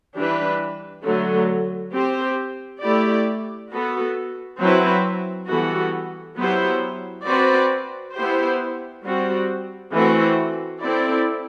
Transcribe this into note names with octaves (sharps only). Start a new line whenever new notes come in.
E3 G3 D4 G4 B4
D3 F#3 A3
C4 G4 C5
A3 E4 G4 D5
B3 F#4 A4
F#3 C4 E4 B4
E3 G3 B3 F#4 A4
F#3 B3 E4 G4 C5
C4 F#4 B4 D5
B3 E4 G4 C5
G3 C4 F#4
E3 A3 C4 F#4
C4 E4 A4 D5